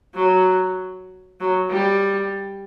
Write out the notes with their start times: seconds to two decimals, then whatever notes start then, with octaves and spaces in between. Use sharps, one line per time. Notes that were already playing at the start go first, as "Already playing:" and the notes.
0.15 F#3
1.40 F#3
1.70 G3